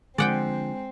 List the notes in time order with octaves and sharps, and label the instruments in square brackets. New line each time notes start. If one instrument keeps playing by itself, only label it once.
[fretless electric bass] D3 F3 [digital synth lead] G#3 [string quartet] C4 [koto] D5 F#5 G5